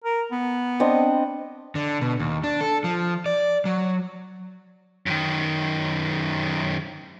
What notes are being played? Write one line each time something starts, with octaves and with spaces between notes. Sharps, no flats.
A#4
B3
C4 D4 D#5
D3
B2
D#2
D4
A4
F3
D5
F#3
F#2 D#3